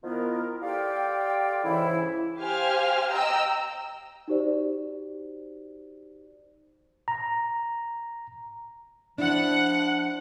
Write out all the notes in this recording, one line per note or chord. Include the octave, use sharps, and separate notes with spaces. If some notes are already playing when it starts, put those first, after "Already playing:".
D#3 F3 B3 E4 F4 A#4
F4 G4 A4 D5 F5 G5
G#2 C#3 E3 E4
G4 C5 F5 G#5 F6
D#5 G5 A#5 E6
D#4 F#4 G4 C5 D5
A#5
F3 D4 E4 F#5